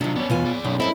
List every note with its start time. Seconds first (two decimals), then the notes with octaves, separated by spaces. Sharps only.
0.01 C3 D#3 F#3 D4 F4
0.16 B3 C#4 C#5 D5
0.30 B1 E2 B2 F4 G#5
0.45 G#4 D5
0.64 B1 F#2
0.80 F#2 B2 C4 E4 A4 D#5